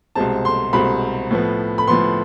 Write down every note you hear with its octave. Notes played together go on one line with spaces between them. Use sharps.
C2 B2 G#3 C4 A5
C6
C2 B2 G#3 C4 B5
A2 F3 B3
B5
A2 F3 B3 C6